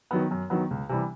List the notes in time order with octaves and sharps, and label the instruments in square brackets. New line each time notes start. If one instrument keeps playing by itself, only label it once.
[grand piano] D#3 F#3 B3
F#2
D#3 F#3 B3
C#2
C3 E3 G3